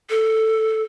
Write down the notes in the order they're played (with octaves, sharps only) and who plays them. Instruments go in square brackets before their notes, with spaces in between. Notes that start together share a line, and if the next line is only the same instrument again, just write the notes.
[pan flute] A4